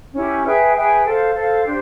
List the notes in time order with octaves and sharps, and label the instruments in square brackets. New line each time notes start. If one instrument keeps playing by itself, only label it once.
[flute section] C#4 E4 G4
G#4 B4 E5 G5
G#4 B4 E5 G5
A4 C5 F5
A4 C5 F5
D4 G4 C5